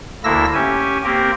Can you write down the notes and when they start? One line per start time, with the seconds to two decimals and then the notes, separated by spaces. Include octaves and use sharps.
0.24 D2 D3 A#3 E4 E6 A#6
0.54 C#4 G4 G#5
1.04 A#3 C4 G4 A#4